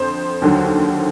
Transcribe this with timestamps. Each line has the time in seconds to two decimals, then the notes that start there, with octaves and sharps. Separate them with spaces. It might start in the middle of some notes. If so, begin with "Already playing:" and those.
Already playing: F2 D3 C5
0.42 D#2 D3 F#3